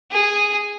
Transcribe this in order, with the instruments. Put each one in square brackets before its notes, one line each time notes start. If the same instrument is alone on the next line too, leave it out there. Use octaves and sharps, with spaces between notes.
[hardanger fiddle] G#4